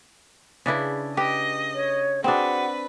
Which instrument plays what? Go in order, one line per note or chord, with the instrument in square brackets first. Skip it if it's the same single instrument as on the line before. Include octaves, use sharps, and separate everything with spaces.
[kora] C#3 D4 E4 [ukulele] G#4 B4
[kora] G4 [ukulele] B4 G5 [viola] D#5
[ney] C#5
[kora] C4 D4 [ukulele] F#4 G#4 G5 [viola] B4 [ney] F#5